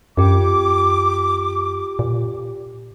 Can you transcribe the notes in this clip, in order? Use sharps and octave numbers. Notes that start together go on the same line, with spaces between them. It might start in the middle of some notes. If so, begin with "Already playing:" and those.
F#2 F4 G4 G5 D6
A#2